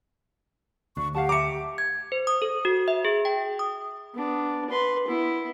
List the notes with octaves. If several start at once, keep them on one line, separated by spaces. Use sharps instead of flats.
D2 D4 C#6
G4 F5 F#5 A5
E5 A5 A#5 D6 C#7
G#6
C5
D#6
A4
F#4
E5
G#4
G5
D#6
B3 D4
B4 C6
B3 E4